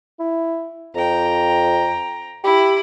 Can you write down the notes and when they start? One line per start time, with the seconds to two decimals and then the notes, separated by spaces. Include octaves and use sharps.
0.20 E4
0.95 F2 G5 A#5
2.44 E4 G4 B5